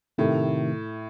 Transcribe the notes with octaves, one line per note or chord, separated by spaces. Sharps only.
A2 C3 D#3 A3